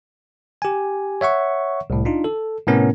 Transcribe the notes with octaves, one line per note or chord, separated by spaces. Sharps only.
G4 G#5
C#5 E5 F#5 C#6
C2 A2
D4 D#4 F4
A4
A2 C3 B3 C#4 A#4